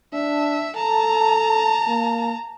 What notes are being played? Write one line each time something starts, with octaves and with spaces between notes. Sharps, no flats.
D4 E5
A4 A5 A#5
A#3